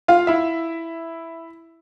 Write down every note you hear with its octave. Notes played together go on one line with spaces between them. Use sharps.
F4 F5
E4 E5